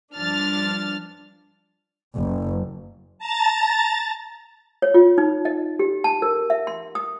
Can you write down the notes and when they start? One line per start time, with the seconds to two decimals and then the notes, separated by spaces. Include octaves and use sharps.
0.15 G2 F3 D4 F6 A6
2.16 F#1
3.18 A5 A#5 A6
4.82 C#5
4.94 F4
5.18 D#4
5.45 D#5
5.79 G4
6.04 A5
6.22 A#4
6.50 E5
6.67 C6
6.95 D#6